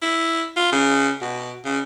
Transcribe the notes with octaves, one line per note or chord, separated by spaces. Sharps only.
E4
F4
C#3
B2
C#3